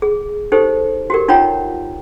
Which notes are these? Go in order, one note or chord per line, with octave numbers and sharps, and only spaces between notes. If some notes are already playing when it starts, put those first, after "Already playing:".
G#4
D#4 G4 A4 C5
F#4 G4 A#4
D#4 F4 C#5 F#5 G5 A#5